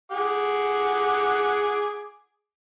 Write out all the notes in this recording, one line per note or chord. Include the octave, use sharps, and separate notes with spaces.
G#4 F#5 D6